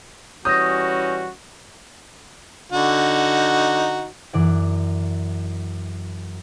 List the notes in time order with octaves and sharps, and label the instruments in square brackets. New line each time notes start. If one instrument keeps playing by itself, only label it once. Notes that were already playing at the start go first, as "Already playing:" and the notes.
[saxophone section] E3 G3 C#4 [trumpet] F#4 [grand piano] D#6 [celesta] G6 A#6
[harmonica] D3 D#4 F#4
[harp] F#2 E3 D5 F#5